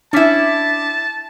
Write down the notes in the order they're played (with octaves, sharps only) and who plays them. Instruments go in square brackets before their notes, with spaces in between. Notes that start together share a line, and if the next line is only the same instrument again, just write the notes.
[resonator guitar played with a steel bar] C#4 E4 [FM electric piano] D4 D6 B6 [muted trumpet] A5